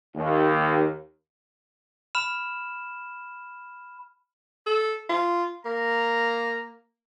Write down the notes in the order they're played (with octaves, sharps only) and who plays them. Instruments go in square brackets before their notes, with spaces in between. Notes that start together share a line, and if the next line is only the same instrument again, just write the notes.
[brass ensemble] D#2
[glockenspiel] B5 F6 E7
[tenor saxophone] A4
F4
[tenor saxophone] A#3 [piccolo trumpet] A#5